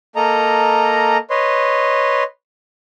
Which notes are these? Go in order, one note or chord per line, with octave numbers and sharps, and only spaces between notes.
A#3 A4 D#5 A#5
B4 C#5 D#5 C6